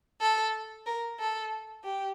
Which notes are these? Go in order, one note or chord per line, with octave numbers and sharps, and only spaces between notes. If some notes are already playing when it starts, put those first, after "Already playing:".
A4
A#4
A4
G4